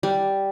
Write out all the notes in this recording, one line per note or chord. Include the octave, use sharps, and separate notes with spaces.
G3